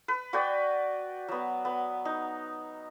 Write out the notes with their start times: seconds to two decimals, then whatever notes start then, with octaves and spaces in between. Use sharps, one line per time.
0.08 B4
0.33 F#4 B4 D5 G5
1.28 F#3 B3
1.65 B3
2.05 D#4